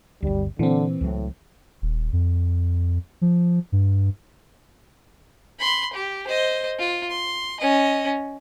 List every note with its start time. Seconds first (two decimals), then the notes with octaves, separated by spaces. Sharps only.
0.23 G1 D2 G3
0.59 A#2 D3 E3 C4
1.01 C#2 A2 F#3
1.82 D#1
2.13 F2
3.21 F3
3.72 G2
5.59 B5 C6
5.93 G4
6.27 C5 D#5
6.79 F4
7.10 C6
7.60 C#4 D#5